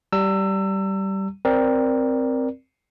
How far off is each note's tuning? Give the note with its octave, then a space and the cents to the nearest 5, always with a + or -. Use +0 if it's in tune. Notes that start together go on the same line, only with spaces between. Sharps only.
G3 -15 A#5 -40 E6 +20
C4 +0 A#4 +15 D5 +0